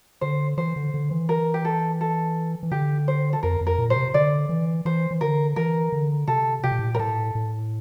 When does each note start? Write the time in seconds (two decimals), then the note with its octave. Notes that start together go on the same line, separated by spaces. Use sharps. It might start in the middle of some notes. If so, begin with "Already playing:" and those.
0.21 D3 C5
0.57 E3 C5
0.76 D3
0.94 D3
1.11 E3
1.29 A#4
1.54 G4
1.65 A4
2.01 A4
2.63 E3
2.72 D3 G4
3.08 C5
3.33 A4
3.43 F2 A#4
3.61 F2
3.67 A#4
3.78 A#2
3.90 C5
3.96 C3
4.14 D3 D5
4.49 E3
4.85 E3 C5
5.11 E3
5.21 D3 A#4
5.56 E3 A#4
5.92 D3
6.28 C3 A4
6.64 C3 G4
6.72 A#2
6.79 A2
6.86 A#2
6.95 A#4
6.99 A2 A4
7.35 A2